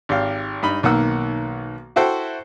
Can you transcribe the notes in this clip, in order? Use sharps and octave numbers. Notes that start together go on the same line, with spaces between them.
G#1 G4 F5
G2 D#4 B5
B1 D#3 A#3 F#5 E6
E4 F#4 A4 C5 G5